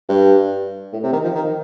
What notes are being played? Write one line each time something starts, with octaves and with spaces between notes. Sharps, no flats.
G2
A2
C3
D#3
F3
D#3